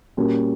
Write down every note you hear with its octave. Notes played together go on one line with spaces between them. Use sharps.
A#2 G3 C#4 F#4 A#4